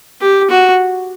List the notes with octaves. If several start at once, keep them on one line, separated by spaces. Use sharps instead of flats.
G4
F#4